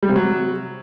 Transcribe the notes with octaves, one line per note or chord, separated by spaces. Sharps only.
G3
C3
F#3